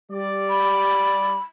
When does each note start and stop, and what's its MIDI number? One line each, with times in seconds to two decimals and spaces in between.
0.11 1.35 55
0.11 1.35 74
0.50 1.39 83